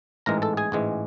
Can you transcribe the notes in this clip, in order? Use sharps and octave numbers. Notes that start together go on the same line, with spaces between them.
A1 G#2 E3 G#3 A#4 A#5
A4 A5
G#4 G#5
A1 G#2 E3 G#3